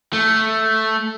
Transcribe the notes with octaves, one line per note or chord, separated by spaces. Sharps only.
A3